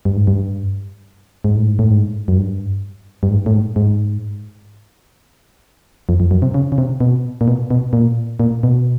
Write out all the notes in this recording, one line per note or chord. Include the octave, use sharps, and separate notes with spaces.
G2
G#2
G2
G#2
A2
G#2
A2
G#2
F#2
G2
G2
G#2
A2
G#2
G#2
F2
F2
F#2
C3
C#3
C#3
C3
B2
A#2
B2
B2
A#2
A#2
B2